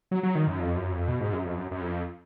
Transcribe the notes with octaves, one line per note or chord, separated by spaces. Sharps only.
F#3
F#3
D#3
F#2
F2
F#2
F2
B2
G#2
F#2
F2
F#2
F#2
F2